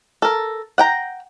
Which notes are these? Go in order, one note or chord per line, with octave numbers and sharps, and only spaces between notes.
A4 A#4
F#5 G5 A#5